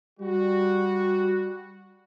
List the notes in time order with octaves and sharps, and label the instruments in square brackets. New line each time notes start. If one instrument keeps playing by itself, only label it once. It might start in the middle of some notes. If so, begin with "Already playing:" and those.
[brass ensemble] G3 F#4